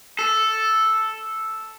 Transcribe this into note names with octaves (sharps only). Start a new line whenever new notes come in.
A4